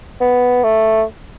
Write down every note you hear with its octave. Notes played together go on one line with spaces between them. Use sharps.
B3
A3